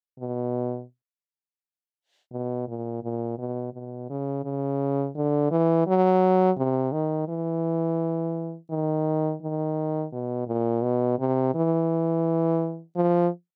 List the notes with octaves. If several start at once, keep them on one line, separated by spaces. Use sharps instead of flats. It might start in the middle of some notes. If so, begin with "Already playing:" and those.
B2
B2
A#2
A#2
B2
B2
C#3
C#3
D3
E3
F#3
C3
D#3
E3
D#3
D#3
B2
A#2
B2
C3
E3
F3